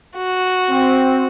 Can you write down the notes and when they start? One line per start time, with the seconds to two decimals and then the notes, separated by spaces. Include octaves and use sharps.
0.16 F#4
0.70 C4